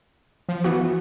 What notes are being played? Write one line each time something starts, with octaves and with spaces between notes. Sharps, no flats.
F3
E3 B3 F#4